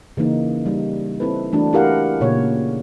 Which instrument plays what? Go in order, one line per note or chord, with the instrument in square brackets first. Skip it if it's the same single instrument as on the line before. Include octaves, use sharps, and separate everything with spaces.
[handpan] C#3 E3 A#3 D#4
G3 D#4
C4 E4 A4 B4
E3 A3 D4 F#4
E4 G4 A#4 F5 F#5
A#2 C#3 C#5